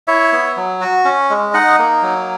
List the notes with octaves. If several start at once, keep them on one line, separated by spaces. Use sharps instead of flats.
E4 C#5 E5
B3
F#3
F#4
C#4
G#3
D#4 D#5 F#5
A#3
F#3